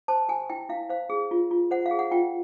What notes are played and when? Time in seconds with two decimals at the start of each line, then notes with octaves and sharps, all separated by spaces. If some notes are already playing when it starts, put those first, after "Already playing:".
0.08 C5 A5
0.29 G4 G#5
0.49 E4 G5
0.69 E4 F5
0.89 C5 F5
1.10 G#4
1.31 F4
1.51 F4
1.71 C5 F#5
1.86 F5
1.91 G#4
1.99 F#5
2.11 F4 G5